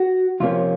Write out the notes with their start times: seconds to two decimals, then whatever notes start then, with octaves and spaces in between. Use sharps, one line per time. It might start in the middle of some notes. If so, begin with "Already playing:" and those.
Already playing: F#4
0.40 F2 C3 F3 A#3 C#4 F4